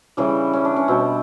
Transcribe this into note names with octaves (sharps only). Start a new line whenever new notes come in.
C#3 E3 G3
C#4
D4
C#4
B2 G3 C4